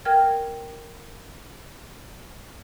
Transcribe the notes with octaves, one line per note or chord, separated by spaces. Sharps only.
A#4 G5 F6 G#6